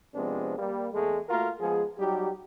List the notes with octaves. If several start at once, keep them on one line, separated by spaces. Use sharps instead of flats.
C3 F3 G#3 B3 C4 D4
G3 A#3
E2 G#3 A3
A3 A#3 F4 F#4 A#4
F3 G#3 B3 G#4
F#3 G3 D#4 F#4 G4